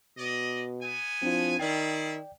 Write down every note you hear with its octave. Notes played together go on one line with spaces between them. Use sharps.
B2 D5 D#5
B3 G#5
F3 C4 D4 E4
D#3 E4 F4 G#4 D5 G5